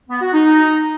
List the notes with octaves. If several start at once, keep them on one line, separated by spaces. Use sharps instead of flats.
B3
F#4
D#4